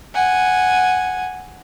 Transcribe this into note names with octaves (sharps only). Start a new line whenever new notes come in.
F#5 G#5